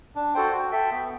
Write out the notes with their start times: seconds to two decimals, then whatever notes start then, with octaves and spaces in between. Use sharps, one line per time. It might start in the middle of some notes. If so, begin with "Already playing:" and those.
0.15 D4
0.35 F#4 A4 C5 G5
0.53 F#4
0.71 A4 E5 G5
0.91 B3